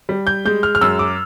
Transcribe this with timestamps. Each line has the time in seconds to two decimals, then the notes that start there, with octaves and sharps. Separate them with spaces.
0.09 G3
0.27 G6
0.45 G#3 G6
0.63 F6
0.75 F6
0.81 F#2 E6
0.99 D6